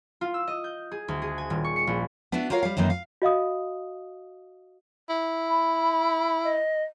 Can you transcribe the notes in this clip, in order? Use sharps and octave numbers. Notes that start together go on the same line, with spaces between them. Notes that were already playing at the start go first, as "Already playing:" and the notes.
F4
E6
D#5
G6
G#4
D2
G#4
G#5
D#1
C#6
C#7
A#1
B3 D4 E4 F#4
F4 F#4 A#4 C#5 F5
G3 F5
F#2 D#3 E3 A#3 D#4
F5
F#4 D#5 F5 D#6
E4
B5
D#5